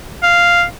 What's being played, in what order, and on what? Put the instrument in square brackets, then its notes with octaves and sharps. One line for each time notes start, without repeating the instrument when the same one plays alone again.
[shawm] F5